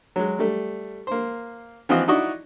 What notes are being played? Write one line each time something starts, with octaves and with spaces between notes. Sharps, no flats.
F#3 G#3
G3 A3
A#3 C5
E3 F3 C4 F4 F#4 D#5
D#4 E4 F#4 D5 D#5 C#6